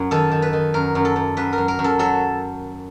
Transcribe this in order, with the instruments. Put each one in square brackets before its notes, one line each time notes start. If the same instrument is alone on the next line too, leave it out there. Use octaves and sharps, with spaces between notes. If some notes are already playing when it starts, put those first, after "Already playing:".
Already playing: [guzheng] F#2
D#3 A4
D#3
B4
D#3
F#2 A#4
F#2
A4
F#2
F#2 B4
F#2 A#4
A#4
F#2
A4
F#3 A4